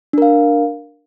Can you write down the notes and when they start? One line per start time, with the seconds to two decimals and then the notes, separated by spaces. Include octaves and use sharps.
0.13 D4
0.18 A#4
0.22 F5